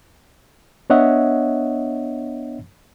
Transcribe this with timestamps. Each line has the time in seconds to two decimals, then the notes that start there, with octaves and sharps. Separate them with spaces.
0.90 B3 D4 C#5 D#5 E5 F#5